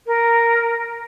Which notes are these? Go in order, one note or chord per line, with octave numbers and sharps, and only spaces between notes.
A#4